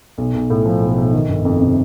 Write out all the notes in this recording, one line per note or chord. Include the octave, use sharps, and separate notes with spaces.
B1
B1
A2
F3
B1
B1
D#3
G1
F2
C3